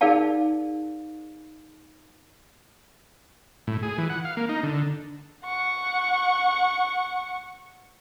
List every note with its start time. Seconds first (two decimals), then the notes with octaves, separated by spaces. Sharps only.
0.01 D#4 G#4 A#4 D5 F5 A5
3.67 A2
3.83 G#4
3.98 E3
4.10 F#5
4.25 F5
4.37 A#3
4.49 D#4
4.63 D3
5.45 F#5 C#6